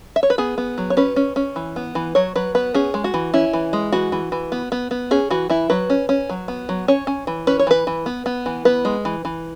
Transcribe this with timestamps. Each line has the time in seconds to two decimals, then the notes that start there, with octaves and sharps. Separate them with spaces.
0.16 E5
0.23 C#5
0.30 B4
0.38 B3 G#4
0.58 B3
0.78 F#3
0.90 C#5
0.97 C#4 B4
1.16 C#4
1.36 C#4
1.56 E3
1.76 B3
1.95 E3
2.15 F#3 C#5
2.36 F#3 B4
2.55 B3 B4
2.74 C#4 G#4
2.94 G#3
3.04 F#4
3.14 E3
3.34 C#4 E4
3.53 E3
3.73 G#3
3.92 E3 F#4
4.12 E3
4.32 E3
4.52 B3
4.72 B3
4.91 B3
5.11 C#4 G#4
5.30 E3 F#4
5.50 E3 E4
5.70 F#3 B4
5.90 C#4
6.09 C#4
6.29 F#3
6.48 B3
6.69 F#3
6.88 C#4 C#5
7.07 C#4
7.27 E3
7.47 C#4 B4
7.59 C#5
7.67 E3 B4
7.87 E3
8.06 B3
8.26 B3
8.46 E3
8.65 B3 B4
8.85 G#3
9.05 E3
9.25 E3